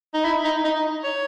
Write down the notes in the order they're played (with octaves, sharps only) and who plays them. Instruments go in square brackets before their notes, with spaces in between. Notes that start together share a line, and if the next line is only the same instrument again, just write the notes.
[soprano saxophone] D#4
E4
D#4
D#4
C#5